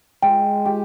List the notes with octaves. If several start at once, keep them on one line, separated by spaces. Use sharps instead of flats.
G#3 G5
G4